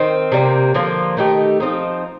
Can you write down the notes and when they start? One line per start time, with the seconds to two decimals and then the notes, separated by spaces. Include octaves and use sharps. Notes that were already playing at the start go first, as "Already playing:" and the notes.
Already playing: D#3 C4
0.32 C3 G3 A#3
0.74 D3 F3 A#3 F4
1.17 D#3 A3 D#4 G4
1.60 F3 C4 D#4